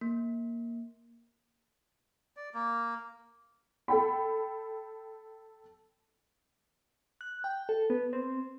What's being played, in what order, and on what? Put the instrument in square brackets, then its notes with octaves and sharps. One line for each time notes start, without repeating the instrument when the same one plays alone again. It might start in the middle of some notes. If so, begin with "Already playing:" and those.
[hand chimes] A#3
[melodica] D5
A#3
[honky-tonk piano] A4 G5 B5
[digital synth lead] F#6
G5
A4
B3
C4